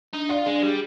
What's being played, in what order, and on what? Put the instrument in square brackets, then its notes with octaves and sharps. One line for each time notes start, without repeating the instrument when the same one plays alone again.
[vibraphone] D4 [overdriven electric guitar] D#4
[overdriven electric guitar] F4 [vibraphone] D5
[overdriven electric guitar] G#3 [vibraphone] D4
[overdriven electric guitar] G3 [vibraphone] G#4